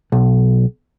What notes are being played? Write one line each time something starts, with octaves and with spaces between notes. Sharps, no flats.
B1